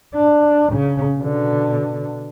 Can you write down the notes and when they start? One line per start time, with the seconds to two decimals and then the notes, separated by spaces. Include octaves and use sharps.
0.14 D4
0.72 C#3
1.18 B2 D3